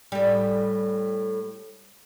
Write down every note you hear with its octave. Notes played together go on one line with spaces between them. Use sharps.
A2 G3